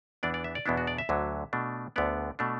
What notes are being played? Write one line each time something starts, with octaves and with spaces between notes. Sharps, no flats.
E2 E3 B3 D4 D5
D5
E5
D5
E2 B2 B3 D4 E4
F#4
D5
E5
D2 D3 F#3
B2 A3 D4
D2 D3 B3 D5
B2 A3 D4